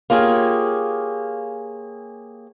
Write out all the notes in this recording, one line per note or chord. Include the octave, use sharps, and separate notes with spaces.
A#3 F4 G4 G#4 C#5